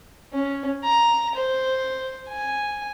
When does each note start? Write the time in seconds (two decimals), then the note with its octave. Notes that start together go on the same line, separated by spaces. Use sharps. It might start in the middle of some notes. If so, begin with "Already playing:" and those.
0.33 C#4
0.84 A#5
1.35 C5
2.28 G#5